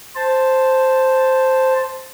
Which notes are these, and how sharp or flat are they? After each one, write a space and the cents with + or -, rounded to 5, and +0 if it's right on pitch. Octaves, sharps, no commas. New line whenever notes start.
C5 +0 A5 +0